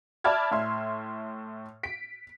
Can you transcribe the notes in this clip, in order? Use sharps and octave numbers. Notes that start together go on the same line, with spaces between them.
D5 E5 A5 B5 F6 G#6
A2 E5 C6
B6 D7